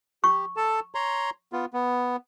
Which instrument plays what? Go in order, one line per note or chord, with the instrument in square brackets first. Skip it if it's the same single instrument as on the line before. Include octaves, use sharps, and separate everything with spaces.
[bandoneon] G4 [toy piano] C#6
[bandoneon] A4 A5
C#5 A#5 C6
B3 F4
B3